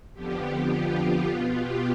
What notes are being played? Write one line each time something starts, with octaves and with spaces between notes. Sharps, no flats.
F2 D3 F3 B3 G4
G4
F4
B2 B3
G4